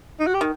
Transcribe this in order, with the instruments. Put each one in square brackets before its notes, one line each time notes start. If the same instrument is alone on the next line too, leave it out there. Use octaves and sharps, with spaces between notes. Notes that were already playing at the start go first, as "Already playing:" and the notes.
[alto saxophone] D#4
F#4
G4
[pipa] D#3